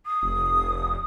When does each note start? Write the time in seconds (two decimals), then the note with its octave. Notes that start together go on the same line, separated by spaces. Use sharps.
0.06 D#6
0.23 F1